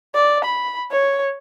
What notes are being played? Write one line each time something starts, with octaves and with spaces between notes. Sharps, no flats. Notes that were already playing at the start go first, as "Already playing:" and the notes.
D5
B5
C#5